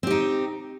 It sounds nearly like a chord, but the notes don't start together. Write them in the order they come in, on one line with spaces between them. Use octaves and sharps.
C4 G4 D#4